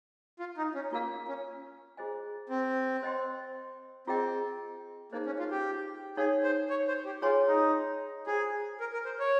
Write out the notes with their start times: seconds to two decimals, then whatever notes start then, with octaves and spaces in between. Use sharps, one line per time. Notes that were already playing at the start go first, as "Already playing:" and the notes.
0.39 F4
0.57 D#4
0.75 C#4
0.92 A#3 F4 A#4 F5
1.28 C#4
1.97 F4 G#4 C5 D#5 G#5
2.49 C4
3.03 C5 D#5 G5 C6
4.07 C4 F4 G#4 D#5 G5
5.12 A#3 D#4 G#4 C5 D#5
5.26 C#4
5.39 F4
5.51 G4
6.17 D#4 G#4 A#4 C#5 F5
6.43 C5
6.70 C#5
6.88 C5
7.05 G4
7.22 F4 G#4 C#5 G#5 C6
7.48 D#4
8.27 F4 G#4 C5 G5
8.80 A#4
8.93 A#4
9.05 C5
9.19 C#5